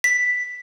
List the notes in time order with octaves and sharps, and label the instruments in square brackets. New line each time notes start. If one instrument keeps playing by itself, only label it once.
[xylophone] B6